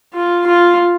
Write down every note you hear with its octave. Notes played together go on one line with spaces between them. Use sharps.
F4
F4